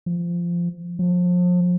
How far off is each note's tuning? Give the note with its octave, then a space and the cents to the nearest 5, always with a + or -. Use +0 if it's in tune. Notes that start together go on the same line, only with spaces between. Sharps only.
F3 -15
F3 +35